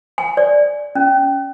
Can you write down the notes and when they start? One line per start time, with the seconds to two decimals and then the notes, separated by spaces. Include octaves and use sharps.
0.18 G#5
0.37 D5
0.95 C#4